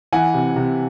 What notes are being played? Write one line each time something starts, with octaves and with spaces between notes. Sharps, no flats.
E3 F#5 G#5
C3
C3